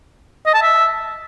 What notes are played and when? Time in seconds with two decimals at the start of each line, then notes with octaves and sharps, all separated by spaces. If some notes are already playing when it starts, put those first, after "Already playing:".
0.46 D#5
0.54 A5
0.62 E5